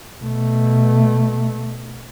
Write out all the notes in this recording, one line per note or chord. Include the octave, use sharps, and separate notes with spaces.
B2 A3